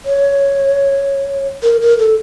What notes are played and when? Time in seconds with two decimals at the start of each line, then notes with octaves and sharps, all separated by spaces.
0.05 C#5
1.64 A#4
1.81 A#4
1.99 A4